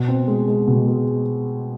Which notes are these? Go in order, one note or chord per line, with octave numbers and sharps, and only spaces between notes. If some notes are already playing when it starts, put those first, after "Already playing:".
Already playing: B2
C4
G#3
G#3
B2
G#3